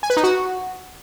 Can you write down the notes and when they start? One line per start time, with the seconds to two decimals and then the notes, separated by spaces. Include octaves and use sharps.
0.03 G#5
0.10 B4
0.17 D#4
0.23 F#4